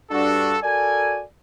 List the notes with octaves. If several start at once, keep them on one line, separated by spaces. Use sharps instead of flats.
G2 D4 F#4 A4
F#4 A4 A#4 D5 G#5